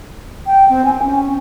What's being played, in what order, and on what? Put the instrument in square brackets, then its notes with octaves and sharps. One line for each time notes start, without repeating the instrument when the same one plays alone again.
[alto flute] G5
C4
G#5
C#4